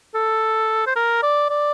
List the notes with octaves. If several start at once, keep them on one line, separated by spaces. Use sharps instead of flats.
A4
C5
A#4
D5
D5